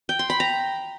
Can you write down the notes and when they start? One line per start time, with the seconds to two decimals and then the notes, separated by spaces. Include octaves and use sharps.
0.09 G5
0.19 C6
0.30 B5
0.40 A#5